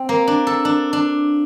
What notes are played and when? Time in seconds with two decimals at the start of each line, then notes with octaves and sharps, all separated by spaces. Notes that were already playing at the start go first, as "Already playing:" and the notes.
Already playing: C4
0.09 A#3
0.27 D4
0.47 A4
0.65 D4
0.93 D4